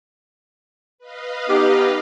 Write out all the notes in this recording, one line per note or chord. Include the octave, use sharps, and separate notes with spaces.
B4 D#5 F5
B3 D#4 G4